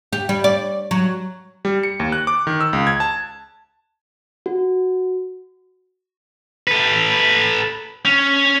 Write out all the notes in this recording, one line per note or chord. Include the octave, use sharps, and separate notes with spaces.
G4
G3
D5
F#3
G3
C#7
D#2
F#6
D6
D#3
E6
C#2
G#6
A5
F#4
A4 B4
C#4